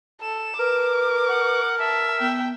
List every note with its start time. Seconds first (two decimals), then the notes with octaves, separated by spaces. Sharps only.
0.22 A4 E7
0.59 A#4 B4 D6
1.28 F#5
1.79 E5 A5
2.20 B3 G5